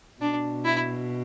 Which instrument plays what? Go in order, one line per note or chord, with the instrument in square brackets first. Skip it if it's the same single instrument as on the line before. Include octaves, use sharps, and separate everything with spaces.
[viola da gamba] B2 [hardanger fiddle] D4
[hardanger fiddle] E4